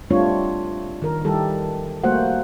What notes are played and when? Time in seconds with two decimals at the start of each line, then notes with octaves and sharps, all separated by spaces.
0.10 G3 A3 C4 D4 F4 C#5
1.02 D#3 A#4
1.25 D#3 G3 E4 G4 A4
2.04 G3 A3 A#3 F#4 C5 F#5